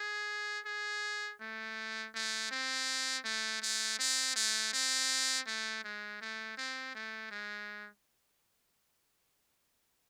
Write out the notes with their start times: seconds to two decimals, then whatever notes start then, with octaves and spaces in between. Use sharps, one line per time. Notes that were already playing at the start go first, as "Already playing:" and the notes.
Already playing: G#4
0.66 G#4
1.41 A3
2.15 A3
2.51 C4
3.25 A3
3.62 A3
3.99 C4
4.36 A3
4.73 C4
5.47 A3
5.84 G#3
6.21 A3
6.58 C4
6.95 A3
7.31 G#3